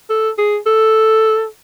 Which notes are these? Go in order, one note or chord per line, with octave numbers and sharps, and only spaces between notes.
A4
G#4
A4